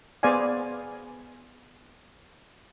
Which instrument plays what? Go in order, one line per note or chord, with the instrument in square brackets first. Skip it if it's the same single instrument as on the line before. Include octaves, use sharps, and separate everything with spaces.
[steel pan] B3 G#4 C5 D5 F5 G#5